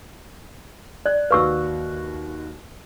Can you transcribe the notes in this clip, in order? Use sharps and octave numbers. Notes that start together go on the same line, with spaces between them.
D5 F#6
D#2 F#4 B4 F5 C#6 E6